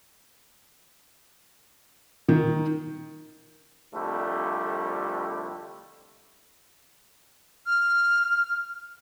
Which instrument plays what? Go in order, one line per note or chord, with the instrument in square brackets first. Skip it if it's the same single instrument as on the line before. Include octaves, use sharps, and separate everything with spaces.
[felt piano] D#3
[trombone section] C2 F2 D3 G3 A3
[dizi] F6